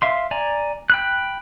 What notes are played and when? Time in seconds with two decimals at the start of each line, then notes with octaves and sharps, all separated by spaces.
0.02 E5 F5 C6
0.31 D5 G#5 A#5
0.90 G5 B5 F#6